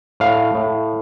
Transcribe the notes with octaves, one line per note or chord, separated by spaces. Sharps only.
A2 F5
A2